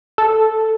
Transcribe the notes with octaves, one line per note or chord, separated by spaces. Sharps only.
A4